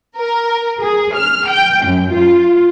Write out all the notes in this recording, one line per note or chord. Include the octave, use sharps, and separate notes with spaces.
A#4
G#4
F6
G5
F#2
F4